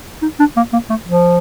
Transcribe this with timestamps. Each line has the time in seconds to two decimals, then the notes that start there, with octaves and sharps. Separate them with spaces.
0.22 D#4
0.40 D4
0.57 A#3
0.73 A#3
0.90 A3
1.07 F3